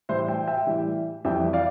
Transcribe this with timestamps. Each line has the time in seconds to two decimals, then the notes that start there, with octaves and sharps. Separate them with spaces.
0.09 A2 E3 G3 C5 E5
0.28 E5 G5
0.47 E5 G5
0.67 A2 E3 G3
1.25 F2 E3 G3 E5 G5
1.53 D5 F5